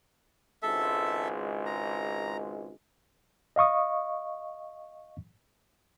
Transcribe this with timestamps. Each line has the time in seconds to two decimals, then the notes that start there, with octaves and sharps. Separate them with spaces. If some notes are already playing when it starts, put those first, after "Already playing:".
0.63 G#1 C#2 G#3 A4 E5
1.66 A#5
3.56 D#5 F5 C#6 D#6